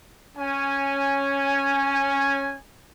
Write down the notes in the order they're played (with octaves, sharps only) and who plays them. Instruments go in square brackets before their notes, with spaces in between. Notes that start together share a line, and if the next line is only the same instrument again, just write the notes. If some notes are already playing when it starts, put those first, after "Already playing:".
[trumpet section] C#4 G#5